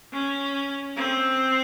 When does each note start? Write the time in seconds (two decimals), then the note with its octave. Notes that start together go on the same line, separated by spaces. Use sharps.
0.13 C#4
0.96 C4